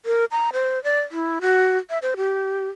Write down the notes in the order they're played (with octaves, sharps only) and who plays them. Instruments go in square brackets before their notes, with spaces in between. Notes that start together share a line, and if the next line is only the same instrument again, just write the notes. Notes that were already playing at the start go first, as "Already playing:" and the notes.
[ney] A#4
A#5
C5
D5
E4
F#4
E5
C5
G4